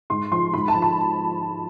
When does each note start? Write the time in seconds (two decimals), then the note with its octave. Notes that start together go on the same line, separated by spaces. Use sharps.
0.10 G#2 C6
0.32 F3 C6
0.54 G#2 B5
0.68 A5
0.75 F3
0.82 B5